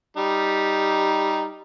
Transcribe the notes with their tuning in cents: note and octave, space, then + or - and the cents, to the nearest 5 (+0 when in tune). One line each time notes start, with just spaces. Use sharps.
G3 +0 D#4 +0